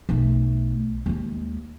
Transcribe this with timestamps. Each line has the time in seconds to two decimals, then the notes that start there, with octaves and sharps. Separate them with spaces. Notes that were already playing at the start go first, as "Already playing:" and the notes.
0.09 B1 A3
1.06 D#2 G#3